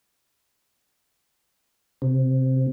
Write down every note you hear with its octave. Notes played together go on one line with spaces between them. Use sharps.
C3